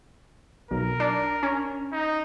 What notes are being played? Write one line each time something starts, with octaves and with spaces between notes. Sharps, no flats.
B1 A#4
D4
C#4
D#4